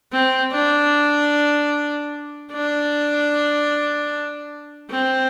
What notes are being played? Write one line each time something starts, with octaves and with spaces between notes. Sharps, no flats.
C4
D4
D4
C4